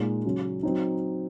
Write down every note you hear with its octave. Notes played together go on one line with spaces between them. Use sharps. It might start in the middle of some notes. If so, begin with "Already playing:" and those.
Already playing: A#2 G#3 D#4
C#3 F#3 C#4
F#3 C4 D#4